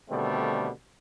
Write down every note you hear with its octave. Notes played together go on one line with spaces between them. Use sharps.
B2 D3 D#3 G3 A3 C4